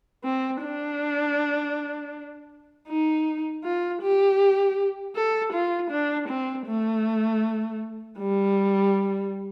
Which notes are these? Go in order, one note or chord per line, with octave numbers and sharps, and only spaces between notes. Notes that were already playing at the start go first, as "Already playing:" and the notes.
C4
D4
D#4
F4
G4
A4
F4
D4
C4
A3
G3